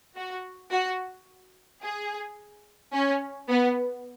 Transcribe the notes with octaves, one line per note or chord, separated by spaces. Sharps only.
F#4
F#4
G#4
C#4
B3